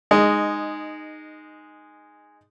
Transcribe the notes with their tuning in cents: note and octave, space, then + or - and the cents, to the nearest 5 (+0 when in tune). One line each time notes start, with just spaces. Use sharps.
G#3 -5 D#4 -15